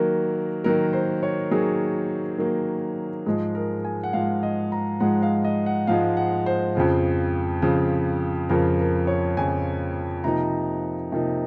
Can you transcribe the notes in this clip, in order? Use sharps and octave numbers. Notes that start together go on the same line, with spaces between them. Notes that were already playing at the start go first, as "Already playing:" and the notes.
Already playing: D#3 F#3 A#3 A#4
D#3 F#3 A#3 A#4
C5
C#5
D#3 F#3 A#3 G#4
D#3 F#3 A#3
G#2 F3 G#3 G#4
A#4
G#5
F#5
G#2 F3 G#3 F5
D#5
A#5
G#2 F3 G#3 F#5
F5
D#5
F#5
G#2 F3 G#3 F5
F#5
C5
F2 C#3 F3
F2 C#3 F3
F2 C#3 F3 A#4
A#4
C#5
F2 C#3 F3 G#5
C3 F3 A#3 D#4 A#5
C3 F3 A#3 D#4